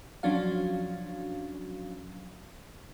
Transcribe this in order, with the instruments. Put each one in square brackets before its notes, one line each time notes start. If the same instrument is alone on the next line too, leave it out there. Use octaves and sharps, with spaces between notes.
[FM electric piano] F3 F#3 C#4 D4 F#4 F5